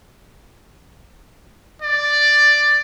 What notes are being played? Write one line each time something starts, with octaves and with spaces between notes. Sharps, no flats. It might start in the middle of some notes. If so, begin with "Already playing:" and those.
D5